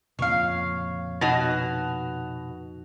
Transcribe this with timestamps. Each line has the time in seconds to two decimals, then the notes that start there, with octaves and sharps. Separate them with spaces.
0.19 F2 A#2 C#3 C#5 F5
1.21 B2 D#4 F#4 F7